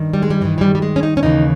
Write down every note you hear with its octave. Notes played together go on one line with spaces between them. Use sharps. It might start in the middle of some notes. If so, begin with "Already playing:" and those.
Already playing: G2 D#3
G3
G#3
G3
G2 D#3 E3
E3
G3
G3
G#3
C#4
D#4
C#4
D#2 C#3 E3 D#4